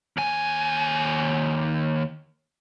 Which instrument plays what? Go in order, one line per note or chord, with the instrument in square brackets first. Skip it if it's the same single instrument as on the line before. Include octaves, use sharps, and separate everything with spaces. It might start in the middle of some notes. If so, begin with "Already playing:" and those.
[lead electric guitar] D#2 G#5